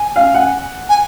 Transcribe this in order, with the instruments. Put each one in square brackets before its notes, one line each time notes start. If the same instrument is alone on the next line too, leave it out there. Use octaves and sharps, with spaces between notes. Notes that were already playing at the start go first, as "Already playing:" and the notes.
Already playing: [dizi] G#5
[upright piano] F5
F#5
[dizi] G#5